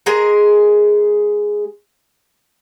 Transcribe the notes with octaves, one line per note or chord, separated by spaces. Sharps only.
G#3 G#4 A#4